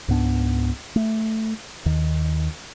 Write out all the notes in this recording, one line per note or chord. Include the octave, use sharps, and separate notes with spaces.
C#2 G#2 B3 D4
A3
D#2 D#3